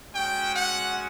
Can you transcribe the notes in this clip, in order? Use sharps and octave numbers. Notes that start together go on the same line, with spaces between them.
G#3 C#4 F#4 G5
F#5